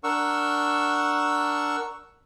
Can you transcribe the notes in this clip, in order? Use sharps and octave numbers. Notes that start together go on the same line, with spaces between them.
D4 A#4 F#5 C#6 E6